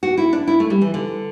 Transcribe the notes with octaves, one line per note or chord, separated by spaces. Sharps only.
F#4
E4
D4
E4
A3
G3
E3
D3